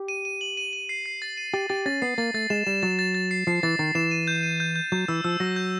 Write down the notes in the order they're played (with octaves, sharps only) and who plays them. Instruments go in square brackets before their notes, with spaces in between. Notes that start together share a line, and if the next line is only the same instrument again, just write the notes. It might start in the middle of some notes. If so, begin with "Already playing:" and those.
Already playing: [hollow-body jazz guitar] G4
[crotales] D#7
D#7
F#7
D#7
D#7
C7
C7
A6
D#7
[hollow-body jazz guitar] G4 [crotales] A6
[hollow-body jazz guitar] G4 [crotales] A6
[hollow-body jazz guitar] C#4 [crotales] A6
[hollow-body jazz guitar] B3 [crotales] C7
[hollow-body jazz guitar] A#3 [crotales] A6
[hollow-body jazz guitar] A3 [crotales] A6
[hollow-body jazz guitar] G#3 [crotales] E7
[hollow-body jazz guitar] G3 [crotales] E7
[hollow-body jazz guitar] F#3 [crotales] A6
[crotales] A6
A6
C7
[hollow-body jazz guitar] F3 [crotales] C7
[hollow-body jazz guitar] E3 [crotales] A6
[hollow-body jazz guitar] D#3 [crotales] A6
[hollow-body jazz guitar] E3 [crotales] E7
[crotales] D#7
G6
D#7
G6
G6
[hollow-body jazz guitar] F#3 [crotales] G6
[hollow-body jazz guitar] E3 [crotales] E6
[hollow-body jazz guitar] F3 [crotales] E6
[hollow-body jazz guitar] F#3 [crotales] A#6
[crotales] G6